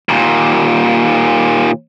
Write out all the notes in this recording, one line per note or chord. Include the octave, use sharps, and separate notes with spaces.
D#2 A#2